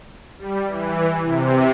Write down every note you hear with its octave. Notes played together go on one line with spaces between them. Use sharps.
G3
E3
C3